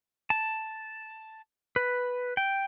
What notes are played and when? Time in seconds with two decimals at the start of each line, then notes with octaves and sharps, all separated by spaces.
0.30 A5
1.76 B4
2.37 G5